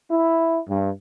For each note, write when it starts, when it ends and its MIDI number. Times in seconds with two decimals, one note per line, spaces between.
0.10 0.60 64
0.68 0.90 43